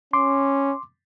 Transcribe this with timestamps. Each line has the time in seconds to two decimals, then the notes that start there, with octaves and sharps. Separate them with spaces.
0.13 C#4 C6 D6